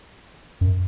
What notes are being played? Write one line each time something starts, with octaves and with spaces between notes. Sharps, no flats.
F#2